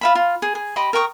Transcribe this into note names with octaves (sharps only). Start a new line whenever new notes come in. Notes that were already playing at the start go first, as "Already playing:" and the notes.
F4 E5 B5
F4
G#4
G#4
G4 D#5 B5 C6
A#4 G5 C#6 D#6